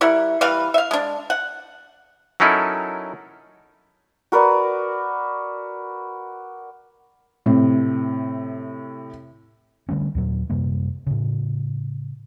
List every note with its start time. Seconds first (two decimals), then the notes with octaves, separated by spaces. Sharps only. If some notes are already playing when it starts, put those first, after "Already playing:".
0.01 G3 E4 A#4 F#5
0.41 E3 G3 B4 F5
0.74 E5 F5
0.91 G#3 D4
1.30 F#5
2.40 F#3 C#4 D#4 E4 A4 A#4
4.32 F#4 A#4 B4 D5
7.46 A2 C3
9.89 D3 G3 A3 C#4
10.15 D#2 A#2 F#3
10.50 F#2 C3 G3 A#3
11.07 A2 C#3